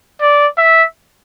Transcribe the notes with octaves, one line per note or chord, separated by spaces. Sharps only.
D5
E5